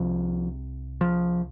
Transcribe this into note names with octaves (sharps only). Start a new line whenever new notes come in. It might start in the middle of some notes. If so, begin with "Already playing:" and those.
Already playing: C2 C3 F3
F3